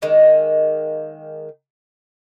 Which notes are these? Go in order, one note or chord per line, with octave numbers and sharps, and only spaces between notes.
D#3 G#3 A#3